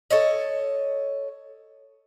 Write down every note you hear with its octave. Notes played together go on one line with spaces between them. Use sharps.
A4 C#5 D#5